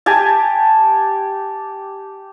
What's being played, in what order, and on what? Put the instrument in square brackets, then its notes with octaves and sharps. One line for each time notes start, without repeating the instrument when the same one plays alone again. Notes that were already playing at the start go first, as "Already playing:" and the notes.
[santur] G4 G#5 A5